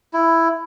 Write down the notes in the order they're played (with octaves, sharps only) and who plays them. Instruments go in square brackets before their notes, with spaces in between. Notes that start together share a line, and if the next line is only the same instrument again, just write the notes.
[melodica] E4